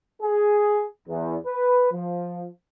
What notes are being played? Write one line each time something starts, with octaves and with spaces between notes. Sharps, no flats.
G#4
E2
B4
F3